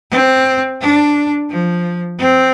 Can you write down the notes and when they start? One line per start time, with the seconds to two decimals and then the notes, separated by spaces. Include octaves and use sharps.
0.11 C4
0.81 D4
1.51 F3
2.19 C4